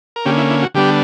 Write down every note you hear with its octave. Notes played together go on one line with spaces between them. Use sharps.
A#4
D3 A#3 C#4 G4
E4
E4
F#4
D3 G3 B3 D4 G4